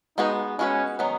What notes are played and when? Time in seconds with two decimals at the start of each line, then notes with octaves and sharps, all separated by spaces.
0.18 G#3 B3 D#4 F#4 B4
0.59 G#3 B3 C#4 F#4 B4
0.99 D#3 F#3 B3 D#4